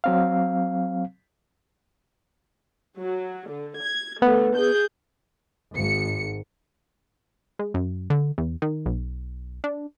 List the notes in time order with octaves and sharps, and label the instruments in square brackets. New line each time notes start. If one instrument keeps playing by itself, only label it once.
[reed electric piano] F#3 C4 F5
[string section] F#3
D3
G#6
[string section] D3 A3 [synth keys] B3
[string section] G#4 G6
G#1 C#7
[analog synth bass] G#3
F#2
D3
E2
D#3
B1
D4